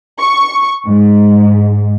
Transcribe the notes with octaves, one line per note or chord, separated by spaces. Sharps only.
C#6
G#2